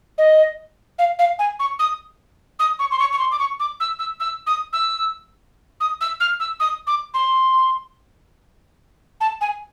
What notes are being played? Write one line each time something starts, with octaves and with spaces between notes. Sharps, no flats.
D#5
F5
F5
G#5
C#6
D#6
D#6
C#6
C6
C#6
C#6
C6
D6
C#6
D6
E6
E6
E6
D#6
E6
D#6
E6
F6
E6
D#6
D6
C6
A5
G#5